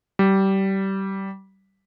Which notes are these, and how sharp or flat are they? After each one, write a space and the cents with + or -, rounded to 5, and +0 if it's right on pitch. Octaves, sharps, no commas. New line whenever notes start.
G3 -20